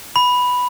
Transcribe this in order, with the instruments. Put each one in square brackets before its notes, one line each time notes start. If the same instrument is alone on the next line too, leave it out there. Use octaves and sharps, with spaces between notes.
[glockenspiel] B5